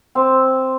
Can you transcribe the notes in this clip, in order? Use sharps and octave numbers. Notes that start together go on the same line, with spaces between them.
C4